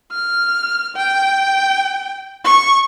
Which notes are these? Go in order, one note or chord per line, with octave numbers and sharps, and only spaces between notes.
F6
G5
C#6